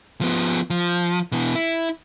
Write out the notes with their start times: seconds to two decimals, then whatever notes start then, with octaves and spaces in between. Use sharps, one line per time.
0.21 F3 B3
0.70 F3
1.32 B2 E3
1.55 E4